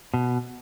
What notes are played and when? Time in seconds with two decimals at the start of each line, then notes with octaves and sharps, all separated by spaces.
0.14 B2